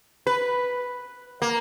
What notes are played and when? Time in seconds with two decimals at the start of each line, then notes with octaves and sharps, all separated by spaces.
0.27 B4
1.42 A#3